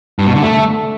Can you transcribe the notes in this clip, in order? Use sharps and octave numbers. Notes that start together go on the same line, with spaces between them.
G2
B2
D3
A3